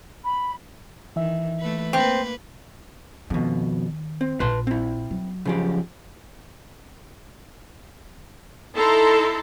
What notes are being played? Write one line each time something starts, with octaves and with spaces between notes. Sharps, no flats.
B5
D#3 E3 E5
A3 A#3 B4
A#3 C4 B4
F2 B2 D#3
C4
A#1 B4 A5 C6
C4 E4
F#3
C#3 F3 G4
D#4 E4 A4 A5 A#5 C6